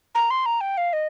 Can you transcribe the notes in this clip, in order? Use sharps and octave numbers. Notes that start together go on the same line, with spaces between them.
A#5
C6
A#5
G5
F5
D#5